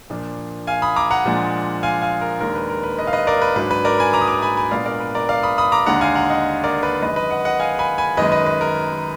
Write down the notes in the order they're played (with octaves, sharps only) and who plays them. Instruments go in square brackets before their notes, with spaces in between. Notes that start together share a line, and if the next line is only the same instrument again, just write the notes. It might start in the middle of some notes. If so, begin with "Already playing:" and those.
[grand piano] A#2 F3 A#3 D4
F5 G#5
B5 D#6
A#5 D6
F#5 A#5
A#2 F3 G#3 D4
F5 G#5
F5 G#5
A#4
D#2 D#3 G#3 D4 A#4
B4
A#4
B4
B4 D#5
F5
B4 D#5
A#4 D5
B4
G#2 F#3 D4 B4
B4
A#4 D5
G#5 B5
A#5 D6
D#6
A#5 D6
G#5 B5
G#5 B5
A#2 G#3 B3 D4 D5 F5
A#4 D5
B4
A#4 D5
D5 F5
B5 D#6
B5 D#6
A#5 D6
D#2 D3 G#3 D4 F#5 A#5
F5 G#5
F#5 A#5
D#5 F#5
A#4 D5
B4
F#2 D#3 G#3 B4 D#5
B4 D#5
D#5 F#5
D#5 F#5
F5 G#5
G#5 B5
G#5 B5
F#2 D#3 G#3 B4 D#5
B4 D#5
B4
A#4